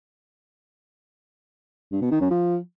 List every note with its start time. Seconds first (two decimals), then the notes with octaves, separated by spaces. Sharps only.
1.92 G2
2.02 B2
2.11 D#3
2.21 F#2
2.31 F3